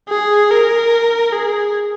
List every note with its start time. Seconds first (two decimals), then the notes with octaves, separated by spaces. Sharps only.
0.09 G#4
0.50 A#4
1.32 G#4